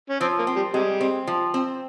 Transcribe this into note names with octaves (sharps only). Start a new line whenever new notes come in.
C#4
F3 C4
A#3
C4
G3
C3 G3 G#3
C4
F3
C4